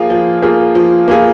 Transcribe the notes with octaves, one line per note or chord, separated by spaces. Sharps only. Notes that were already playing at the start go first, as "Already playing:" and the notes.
Already playing: F3 A#3 F4 G#4
F3
A#3 F4 G#4
F3
A#3 F4 G#4